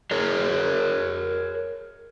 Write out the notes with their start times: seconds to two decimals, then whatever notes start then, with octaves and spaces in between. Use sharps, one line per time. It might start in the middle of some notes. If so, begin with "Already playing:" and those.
0.11 G#4 A#4 C#5